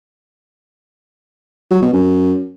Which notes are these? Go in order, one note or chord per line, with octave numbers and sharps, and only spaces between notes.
F#3
B2
F#2